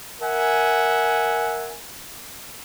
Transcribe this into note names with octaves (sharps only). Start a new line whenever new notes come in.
A#4 E5 F#5 G#5